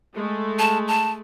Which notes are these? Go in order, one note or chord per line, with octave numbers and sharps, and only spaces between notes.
G#3 A3
A5
A5